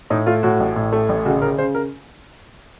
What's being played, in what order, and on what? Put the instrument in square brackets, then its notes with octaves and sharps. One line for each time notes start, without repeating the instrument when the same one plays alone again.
[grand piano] A2 D#4
A3 F4
A2 F#4
A1
A2
A3
A1
C#3 F#4
C#3 A#4
C#3 C5
A#4